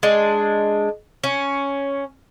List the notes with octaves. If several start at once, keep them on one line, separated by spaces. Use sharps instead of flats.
G#3 D4
C#4